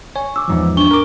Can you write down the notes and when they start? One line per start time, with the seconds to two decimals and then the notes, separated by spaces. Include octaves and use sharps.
0.16 C#5 G#5
0.36 D6 E6
0.48 E2 G#2 F3
0.77 D4 C#6 G7
0.91 A#4 D6